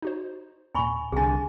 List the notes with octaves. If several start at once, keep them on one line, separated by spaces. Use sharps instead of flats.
D#4 F#4 C5
D#2 A#2 G#5 B5 C#6
C2 D3 C4 G#4 G#5 A6